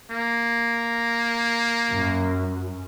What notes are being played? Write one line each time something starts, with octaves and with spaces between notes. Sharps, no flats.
A#3
F#2